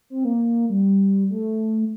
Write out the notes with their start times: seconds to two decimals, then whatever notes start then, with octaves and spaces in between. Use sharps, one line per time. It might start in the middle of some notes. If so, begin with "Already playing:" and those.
0.10 C4
0.25 A#3
0.70 G3
1.30 A3